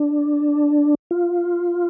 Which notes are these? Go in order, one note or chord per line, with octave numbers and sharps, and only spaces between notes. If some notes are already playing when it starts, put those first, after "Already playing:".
Already playing: D4
F4